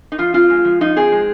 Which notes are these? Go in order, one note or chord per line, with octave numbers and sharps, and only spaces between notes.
D#4
F3 F4
C4 F4
G#3
F3
F3 D#4
C4 G#4
G#3